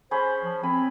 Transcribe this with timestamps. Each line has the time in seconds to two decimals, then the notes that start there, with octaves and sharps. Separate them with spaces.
0.11 C#4 G#4 C5 B5
0.42 F3
0.63 C4 G#5 B5